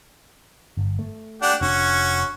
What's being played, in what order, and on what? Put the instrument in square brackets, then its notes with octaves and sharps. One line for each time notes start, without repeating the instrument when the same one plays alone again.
[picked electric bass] G1
A3
[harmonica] D4 G4 F#5
[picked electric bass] F1 D4 [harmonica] C#4 F#4